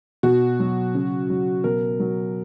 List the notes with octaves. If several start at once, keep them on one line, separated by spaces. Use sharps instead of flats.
B2 F#4
F#3
C#3
F#3
B2 A#4
F#3